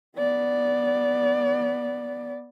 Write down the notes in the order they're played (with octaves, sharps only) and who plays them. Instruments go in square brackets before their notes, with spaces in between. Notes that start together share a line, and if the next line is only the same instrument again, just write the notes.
[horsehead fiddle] B3 D5